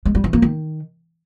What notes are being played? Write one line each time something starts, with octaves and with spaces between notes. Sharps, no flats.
G#3
G3
E3
A#3
D#3